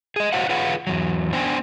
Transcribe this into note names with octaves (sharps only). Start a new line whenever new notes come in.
G#4 D#5
F#4 G4 C5 C#5 F5 F#5
F4 G#4 B4 C#5 F5 F#5
E2 F#3
B3 D4 C5 D5 G5 G#5